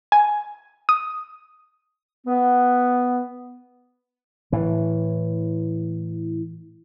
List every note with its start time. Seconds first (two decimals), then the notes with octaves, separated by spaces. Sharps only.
0.12 G#5
0.89 D#6
2.27 B3
4.52 A2 E3